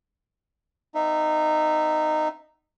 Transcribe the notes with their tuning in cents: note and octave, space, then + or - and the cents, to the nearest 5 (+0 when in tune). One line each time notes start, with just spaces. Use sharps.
B3 +40 D#4 -15 E5 +0